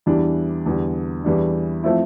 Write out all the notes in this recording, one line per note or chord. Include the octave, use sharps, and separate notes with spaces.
E2 E3 G3 D4
E2 D3 G3 D4
E2 E3 G3 D4
F3 A3 C4 E4